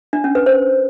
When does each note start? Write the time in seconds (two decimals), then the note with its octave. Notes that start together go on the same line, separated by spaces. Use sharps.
0.13 D4
0.24 C#4
0.35 B4
0.46 C5